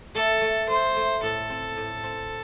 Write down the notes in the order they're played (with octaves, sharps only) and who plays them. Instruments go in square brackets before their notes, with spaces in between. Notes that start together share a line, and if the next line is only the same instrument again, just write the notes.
[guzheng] A3 [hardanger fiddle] A4
[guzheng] A3
[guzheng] A3 [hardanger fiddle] C5
[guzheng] A3
[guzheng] A2 [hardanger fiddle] A4
[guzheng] C4
A2
C4